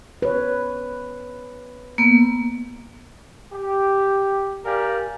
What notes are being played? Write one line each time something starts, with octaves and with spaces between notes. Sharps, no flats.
B4 C#5
A#3 B3
G4
G4 A#4 D5 F5 G5 G#5